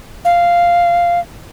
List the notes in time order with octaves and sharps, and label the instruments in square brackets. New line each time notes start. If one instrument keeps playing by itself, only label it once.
[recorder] F5